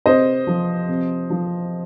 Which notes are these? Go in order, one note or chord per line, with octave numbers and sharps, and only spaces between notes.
C3 C5 D#5
F3
C3
F3